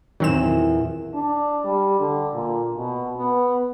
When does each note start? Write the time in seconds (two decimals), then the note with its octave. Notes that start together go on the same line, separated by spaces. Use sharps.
0.20 E2 A#2 D#3 F#3 C4 E7
1.14 D4
1.65 G3
2.00 D3
2.34 A#2
2.76 B2
3.17 B3